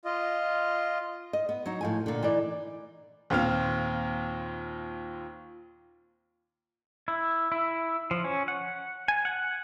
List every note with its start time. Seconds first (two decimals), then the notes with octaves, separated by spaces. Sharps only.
0.05 F4 D#5
1.33 D#5
1.49 B3
1.66 F#3 D#4
1.81 A2 F3 G#5
2.06 A#2 D3
2.23 E3 D#4 D5
3.30 D#2 A#2 C4 F4 F6
7.08 E4
7.52 E4
8.11 F3
8.24 C#4
8.48 F#5
9.08 G#5
9.25 F#5